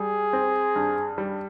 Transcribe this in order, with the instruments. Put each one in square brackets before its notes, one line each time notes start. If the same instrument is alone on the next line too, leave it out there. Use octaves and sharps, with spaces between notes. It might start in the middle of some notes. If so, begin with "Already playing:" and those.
Already playing: [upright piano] G3 [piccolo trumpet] G#4
[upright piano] C4
G2
G3